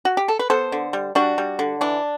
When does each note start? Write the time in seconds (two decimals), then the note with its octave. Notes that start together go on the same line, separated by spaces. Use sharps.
0.05 F#4
0.17 G4
0.28 A4
0.39 B4
0.50 B3 A4 C5
0.72 D3
0.93 G3
1.15 G3 D4 F#4
1.38 G3
1.59 D3
1.81 E3 D4